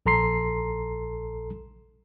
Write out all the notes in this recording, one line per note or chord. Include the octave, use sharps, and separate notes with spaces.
A#1 A4 A#5 C6 C7